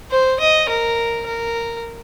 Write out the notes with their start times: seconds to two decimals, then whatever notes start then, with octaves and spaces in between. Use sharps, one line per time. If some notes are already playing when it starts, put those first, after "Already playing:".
0.11 C5
0.40 D#5
0.69 A#4
1.27 A#4